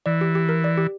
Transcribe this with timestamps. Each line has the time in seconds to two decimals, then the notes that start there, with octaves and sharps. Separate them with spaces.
0.06 E3 D5
0.21 G4
0.35 G4
0.49 A#4
0.64 D5
0.78 G4